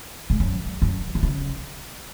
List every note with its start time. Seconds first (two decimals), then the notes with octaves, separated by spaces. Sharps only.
0.30 G#2
0.40 F#2
0.82 F#2
1.15 D#3
1.23 C#3